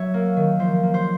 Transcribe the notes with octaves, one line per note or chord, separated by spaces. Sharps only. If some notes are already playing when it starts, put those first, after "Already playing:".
Already playing: F#3 C#5 E5
A#3
D#3
F3 C5
A#3
C5